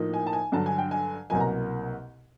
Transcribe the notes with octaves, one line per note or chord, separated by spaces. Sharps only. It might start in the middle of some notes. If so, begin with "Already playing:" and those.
Already playing: A2 F3 A#3 D#4
G#5
A5
G#5
G2 D3 F#3 A5
G#5
G5
G#5
C2 B2 F#3 A#3 G#5
A#5